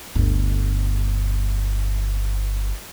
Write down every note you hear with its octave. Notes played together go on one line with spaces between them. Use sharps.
G1 D2